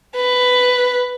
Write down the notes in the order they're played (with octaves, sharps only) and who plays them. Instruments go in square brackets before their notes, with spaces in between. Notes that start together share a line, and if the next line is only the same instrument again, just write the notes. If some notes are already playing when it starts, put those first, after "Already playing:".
[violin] B4